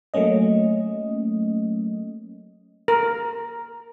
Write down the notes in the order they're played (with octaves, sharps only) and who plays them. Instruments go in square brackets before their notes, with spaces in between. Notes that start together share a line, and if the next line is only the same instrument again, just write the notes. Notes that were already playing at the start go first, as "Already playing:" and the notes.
[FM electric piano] F#3 A3 A#3 C#4 D#5
[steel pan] A#4